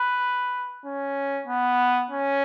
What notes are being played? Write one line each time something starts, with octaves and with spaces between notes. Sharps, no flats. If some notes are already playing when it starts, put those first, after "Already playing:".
Already playing: B4
C#4
B3
C#4